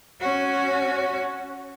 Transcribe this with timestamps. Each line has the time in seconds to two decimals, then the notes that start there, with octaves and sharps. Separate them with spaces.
0.21 C#4 F#4